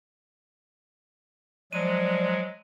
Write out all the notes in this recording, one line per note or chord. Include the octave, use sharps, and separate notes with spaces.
F3 F#3 G#3 D5 D#7